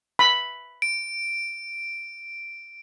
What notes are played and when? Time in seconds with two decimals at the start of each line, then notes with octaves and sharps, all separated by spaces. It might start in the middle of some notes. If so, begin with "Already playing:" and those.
0.19 B5
0.82 D7